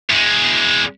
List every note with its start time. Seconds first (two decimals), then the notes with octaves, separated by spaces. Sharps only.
0.09 E2 G#3